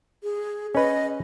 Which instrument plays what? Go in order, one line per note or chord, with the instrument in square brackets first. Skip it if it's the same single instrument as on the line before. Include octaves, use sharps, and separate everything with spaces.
[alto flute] G#4
[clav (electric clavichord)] C#4 B4 [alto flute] D#5